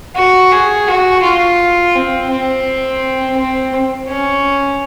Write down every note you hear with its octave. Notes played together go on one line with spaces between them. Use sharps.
F#4
G#4
F#4
F4
C4
C4
C4
C#4